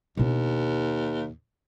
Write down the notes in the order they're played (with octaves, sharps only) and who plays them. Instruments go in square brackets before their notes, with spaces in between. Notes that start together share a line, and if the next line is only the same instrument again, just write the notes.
[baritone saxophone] D#2 [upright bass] B2 D4